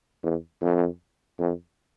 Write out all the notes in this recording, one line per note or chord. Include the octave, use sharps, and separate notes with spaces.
E2
F2
F2